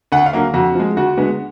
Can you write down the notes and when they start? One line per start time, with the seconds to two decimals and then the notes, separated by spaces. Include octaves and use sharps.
0.12 D2 F#5
0.26 F5
0.33 D3 F#3 A#3
0.54 F2 F#4
0.75 F3 G#3
0.97 D2 F#4
1.17 D3 G#3 B3